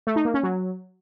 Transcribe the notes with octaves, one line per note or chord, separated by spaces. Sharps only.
A3
D#4
A#3
C#4
F#3